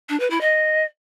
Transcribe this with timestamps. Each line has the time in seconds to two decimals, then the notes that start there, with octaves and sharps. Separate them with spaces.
0.09 D4
0.20 B4
0.30 E4
0.41 D#5